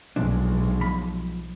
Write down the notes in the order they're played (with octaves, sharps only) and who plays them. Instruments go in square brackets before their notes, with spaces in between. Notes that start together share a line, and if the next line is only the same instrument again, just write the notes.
[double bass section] B1 G#3 [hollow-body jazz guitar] A#2 F3 D4
[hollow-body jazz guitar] F3 B5